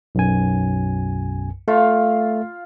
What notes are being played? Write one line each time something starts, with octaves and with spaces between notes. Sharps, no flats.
B1 F#2 G#5
A3 F4